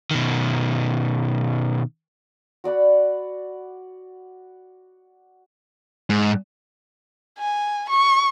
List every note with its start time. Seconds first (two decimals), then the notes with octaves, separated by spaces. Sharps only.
0.11 B2 D#3
2.64 F#4 D5 F#5 B5
6.10 G#2
7.39 G#5
7.90 C#6